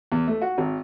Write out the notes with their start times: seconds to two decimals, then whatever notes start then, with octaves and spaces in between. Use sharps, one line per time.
0.12 E2
0.27 A3
0.42 F#4
0.58 G#1